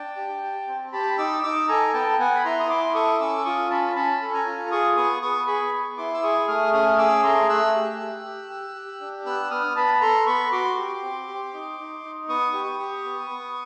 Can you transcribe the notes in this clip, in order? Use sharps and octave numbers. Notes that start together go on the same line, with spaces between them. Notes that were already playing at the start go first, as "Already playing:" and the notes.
Already playing: D4 G5 A5
G4
G4
C4
G4 A5 B5
D#4 D6 E6
D#4 D6 E6
A4 G#5 A#5
B3 G5 A5
B3 F#5 G#5
B5
E4 A#5 C6
D#6
E4 C6 D6
A4 C#6 D#6
C#4 D6 E6
F4 C#6 D#6
C#4 A5 B5
C#4 A5 B5
A4
G#5 A#5
F4
G#4 C#6 D#6
B3 C#6 D#6
B3 C#6 D#6
G#4 B5 C#6
B3
E4 C6 D6
E6
G#4 C#6 D#6
A3 D#6 F6
C#4 D#6 F6
G#4 D6 E6
A3 A#5 C6
A3 E6 F#6
G4
G4
G4
G4
G4
D4
B3 E6 F#6
B3 D#6 F6
B3 A5 B5
A4 A#5 C6
B3 B5 C#6
F#4 C6 D6
G4
C4
G4
D#4
D#4
D#4
B3 C#6 D#6
G4
G4
B3
B3